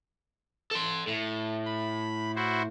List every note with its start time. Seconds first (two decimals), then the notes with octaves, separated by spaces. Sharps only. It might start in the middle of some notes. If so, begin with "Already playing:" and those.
0.71 A4 C6
1.07 A2
1.66 B5
2.36 E4 F#4 C5